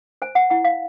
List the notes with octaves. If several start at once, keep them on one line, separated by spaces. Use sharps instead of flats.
C5 G#5
F#5
E4 F#5
F5